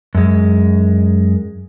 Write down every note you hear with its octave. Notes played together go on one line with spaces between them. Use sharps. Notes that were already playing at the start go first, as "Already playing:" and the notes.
F#2 G#3